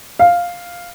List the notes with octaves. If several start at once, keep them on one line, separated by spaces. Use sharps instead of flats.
F5